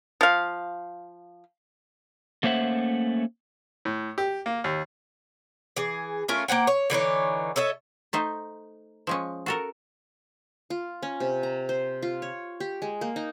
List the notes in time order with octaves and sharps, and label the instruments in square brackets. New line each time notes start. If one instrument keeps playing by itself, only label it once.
[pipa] F3 F5
[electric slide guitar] A3 A#3 C#4 C5 E5 F#5
[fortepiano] A2
G4
A#3
D#2
[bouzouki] E3 G#4
A3 C#4 F4 A#4
A#3 C5 F#5 G5
C#5
D3 E3 D#4 C#5
A4 C#5 D#5 E5
[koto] A3 D#4 C5
F3 G#3 C#4
F#4 A4 A#4
[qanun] F4
C#4
C3
A#5
C5
F4
C#5
G4
G#3
A#3
D#4